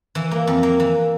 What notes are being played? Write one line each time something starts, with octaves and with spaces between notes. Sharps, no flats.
E3
A#3
F2
A#3
E3